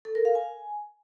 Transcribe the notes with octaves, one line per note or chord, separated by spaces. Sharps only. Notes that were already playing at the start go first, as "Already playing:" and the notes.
A4
A#4
F5
G#5